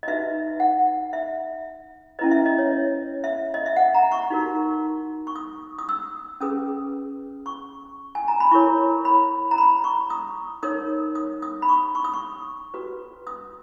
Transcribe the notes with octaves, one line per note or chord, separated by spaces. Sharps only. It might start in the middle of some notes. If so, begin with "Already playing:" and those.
D#5
D#4 F#4 B4 E5
F#5
E5
C#4 E4 B4 D#5
E5
D#5
C#5
E5
D#5
E5
F#5
A#5
C#6
D#4 F#4 A#4
C#6
D#6
D#6
E6
C#4 G#4 B4 D#6
C#6
G#5
A#5
B5
E4 A#4 C#5 C#6
B5
A#5
B5
C#6
D#6
D#4 A#4 C#5 D#6
D#6
D#6
B5
C#6
C#6
D#6
C#6
F#4 B4
D#6